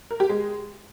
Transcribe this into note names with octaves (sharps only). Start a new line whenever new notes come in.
A#4
G4
G#3